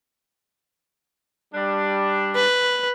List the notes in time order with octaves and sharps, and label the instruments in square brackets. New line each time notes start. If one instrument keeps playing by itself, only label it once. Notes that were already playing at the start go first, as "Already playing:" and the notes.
[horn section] G3 D4
[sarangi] B4